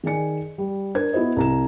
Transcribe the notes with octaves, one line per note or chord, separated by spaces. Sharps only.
D#3 G#4 D5 G#5 C#7
G3
D4 A#4 C5 G#6
B3 E4 F#4 C5 D#5
C2 A#5 E7